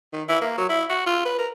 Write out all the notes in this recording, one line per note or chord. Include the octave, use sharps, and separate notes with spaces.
D#3
E4
A#3
F#3
E4
F#4
F4
B4
A#4